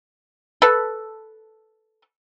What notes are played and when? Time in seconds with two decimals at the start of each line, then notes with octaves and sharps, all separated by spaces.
0.62 A4 B4